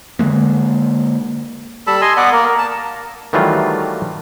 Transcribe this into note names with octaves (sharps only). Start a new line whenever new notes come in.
D3 F3 G#3 A#3
G3 A4 A5 B5
D#5 G#5 C6
B3 B4 D5 F#5
A#3 A#4
A#4
A5
D#3 E3 F#3 G3 A3 F4